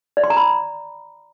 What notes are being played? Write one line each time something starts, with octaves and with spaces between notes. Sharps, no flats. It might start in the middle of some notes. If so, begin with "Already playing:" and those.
D5
C6
A#5
B5